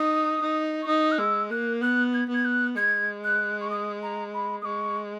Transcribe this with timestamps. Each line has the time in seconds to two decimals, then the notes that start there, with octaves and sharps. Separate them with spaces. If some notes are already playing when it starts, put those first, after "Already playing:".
Already playing: D#4 D#6
0.41 D#4
0.81 C#6
0.87 D#4 D#6
1.11 F#6
1.18 G#3 E6
1.50 A#3 F#6
1.81 B3 F#6
2.13 G#6
2.29 B3 G#6
2.45 F#6
2.75 G#3 G#6
3.23 F#6
3.60 C#6
3.70 D#6
4.01 A#5
4.33 B5
4.61 D#6
4.64 G#3 C#6